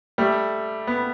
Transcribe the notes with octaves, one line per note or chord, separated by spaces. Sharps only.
G3 A3
B3